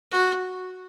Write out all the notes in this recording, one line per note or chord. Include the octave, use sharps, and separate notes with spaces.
F#4